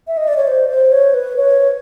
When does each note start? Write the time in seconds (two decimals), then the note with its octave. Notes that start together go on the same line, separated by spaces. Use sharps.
0.08 E5
0.17 D#5
0.28 D5
0.37 C#5
0.47 C5
0.69 C5
0.92 C#5
1.14 B4
1.37 C#5